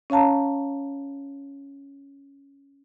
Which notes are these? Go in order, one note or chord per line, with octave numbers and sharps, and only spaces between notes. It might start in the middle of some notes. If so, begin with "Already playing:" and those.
C#4 C#5 F5 A5 A#5